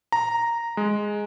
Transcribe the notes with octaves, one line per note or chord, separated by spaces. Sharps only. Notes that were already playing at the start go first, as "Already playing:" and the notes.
A#5
G#3